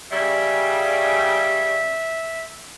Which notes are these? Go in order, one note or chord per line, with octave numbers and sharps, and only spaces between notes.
C#3 G3 E5